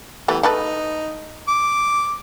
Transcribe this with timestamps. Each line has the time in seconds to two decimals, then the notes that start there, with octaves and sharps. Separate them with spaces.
0.28 E3 G3 A3 B3
0.43 A3 D#4 A4 B4
1.48 D6